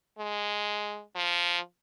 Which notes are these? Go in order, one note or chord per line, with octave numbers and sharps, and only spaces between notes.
G#3
F3